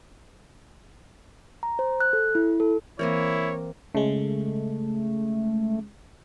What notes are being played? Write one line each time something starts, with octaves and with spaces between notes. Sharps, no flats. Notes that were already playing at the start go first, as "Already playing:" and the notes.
A#5
C5
F#6
A4
E4
A4
E3 A#3 C4 E4 A#4 C#5
C#3 G#3 A3